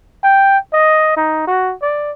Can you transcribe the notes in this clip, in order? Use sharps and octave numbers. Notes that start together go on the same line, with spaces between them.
G5
D#5
D#4
F#4
D5